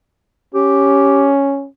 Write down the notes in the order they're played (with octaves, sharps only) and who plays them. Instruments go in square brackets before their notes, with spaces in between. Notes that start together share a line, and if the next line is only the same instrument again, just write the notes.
[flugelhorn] C#4 [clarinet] G4